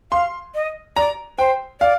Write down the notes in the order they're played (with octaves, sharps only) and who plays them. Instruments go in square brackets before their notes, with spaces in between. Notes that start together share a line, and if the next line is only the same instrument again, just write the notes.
[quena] F5 [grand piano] C6
[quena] D#5
[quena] D5 [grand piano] A#5
[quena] C5 [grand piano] G5
[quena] D5 [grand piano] F5